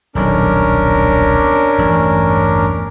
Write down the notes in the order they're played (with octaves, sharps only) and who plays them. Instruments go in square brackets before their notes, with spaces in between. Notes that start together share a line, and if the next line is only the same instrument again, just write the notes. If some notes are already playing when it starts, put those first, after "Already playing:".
[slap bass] D#1 B1 D#3 [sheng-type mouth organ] C#4 D4 A#4
[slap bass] A1 E2 G2